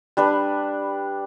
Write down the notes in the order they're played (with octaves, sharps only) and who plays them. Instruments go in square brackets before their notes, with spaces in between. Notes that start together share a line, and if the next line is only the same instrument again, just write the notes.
[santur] G3 D4 B4